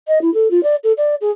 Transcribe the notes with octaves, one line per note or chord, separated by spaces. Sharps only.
D#5
E4
A4
F4
D5
A4
D5
G#4